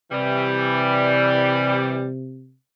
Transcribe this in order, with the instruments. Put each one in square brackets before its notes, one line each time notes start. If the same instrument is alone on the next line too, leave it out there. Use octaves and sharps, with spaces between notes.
[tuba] C3 [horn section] E3 G3